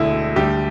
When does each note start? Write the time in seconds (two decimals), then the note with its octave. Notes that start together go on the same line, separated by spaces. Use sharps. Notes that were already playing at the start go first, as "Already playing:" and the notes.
Already playing: E1 D2 D3 A3 E4
0.36 D2 D3 G3 G4